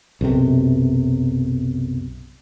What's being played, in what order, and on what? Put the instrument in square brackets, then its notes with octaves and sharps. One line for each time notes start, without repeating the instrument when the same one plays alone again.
[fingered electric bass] B1 F#2 C3